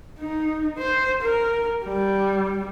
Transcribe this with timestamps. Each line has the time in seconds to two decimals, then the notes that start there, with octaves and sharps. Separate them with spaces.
0.19 D#4
0.78 C5
1.22 A#4
1.84 G3